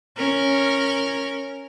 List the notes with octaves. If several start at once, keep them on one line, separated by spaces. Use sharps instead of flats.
C#4 A#4